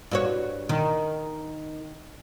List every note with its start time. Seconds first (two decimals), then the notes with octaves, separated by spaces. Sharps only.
0.11 G2 F#4 C#5
0.69 D#3